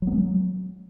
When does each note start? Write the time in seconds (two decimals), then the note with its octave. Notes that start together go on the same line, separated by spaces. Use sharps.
0.02 F#3
0.07 B3
0.12 G#3
0.17 F#3